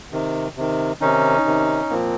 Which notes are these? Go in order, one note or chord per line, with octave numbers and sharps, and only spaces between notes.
C3 D#3
C3 D#3
C3 D#3 C#4 D#4
C3 D#3
A#2 F3 A#3 C4